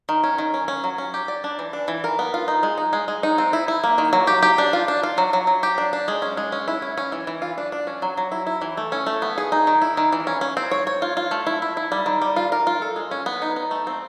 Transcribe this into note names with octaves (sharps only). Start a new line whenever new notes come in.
D#3
C#4
D#3
C#4
C#4
F#3
C#4
G4
D5
D4
E3
D4
E3
A#4
B3
F4
D#4
G#3
D#4
G#3
G#3
D#4
C4
E4
E4
A#3
D#3
F#3
G4
G4
D4
F4
D4
F4
F#3
F#3
F#3
G4
D4
D4
G#3
C#4
G#3
C#4
E4
C#4
C#4
E3
E3
F4
D4
D4
C#4
F#3
F#3
E4
E4
E3
A3
C#4
A3
B3
G#4
D#4
D#3
E4
D#3
E3
C#4
C#4
C4
C#5
C#5
F4
F4
A3
E4
E4
E4
G3
D#3
G3
F4
A#4
F4
A4
G#3
C#4
B3
D#4
D#4
A3
C4